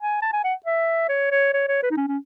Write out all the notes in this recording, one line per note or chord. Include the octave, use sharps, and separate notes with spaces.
G#5
A5
G#5
F#5
E5
C#5
C#5
C#5
C#5
B4
D#4
C#4
C#4